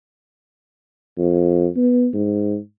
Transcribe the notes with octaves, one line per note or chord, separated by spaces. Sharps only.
F2
B3
G#2